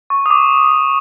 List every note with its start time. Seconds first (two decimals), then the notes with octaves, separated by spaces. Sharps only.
0.10 C#6
0.26 D#6
0.30 D6